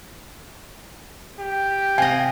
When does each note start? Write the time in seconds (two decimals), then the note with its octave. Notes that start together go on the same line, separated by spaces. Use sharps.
1.40 G4
1.98 C3 D#5 F5 G5 G#5